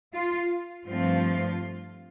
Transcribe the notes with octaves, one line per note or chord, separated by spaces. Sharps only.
F4
G2 F3 A3 C4 F4